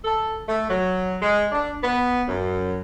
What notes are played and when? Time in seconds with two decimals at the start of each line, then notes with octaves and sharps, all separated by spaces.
0.05 A4
0.48 A3
0.70 F#3
1.22 G#3
1.52 D4
1.84 B3
2.28 F#2